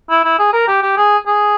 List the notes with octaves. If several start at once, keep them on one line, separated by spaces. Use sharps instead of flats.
E4
E4
G#4
A#4
G4
G4
G#4
G#4